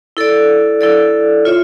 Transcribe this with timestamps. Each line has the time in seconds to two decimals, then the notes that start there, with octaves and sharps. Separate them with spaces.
0.17 E4 A4 D5
0.81 E4 A4 D5
1.45 F4 C#5 E5